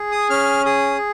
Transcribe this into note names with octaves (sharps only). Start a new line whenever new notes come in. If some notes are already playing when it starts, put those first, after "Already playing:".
Already playing: G#4
D#6
C#4 F6
G#4 D#6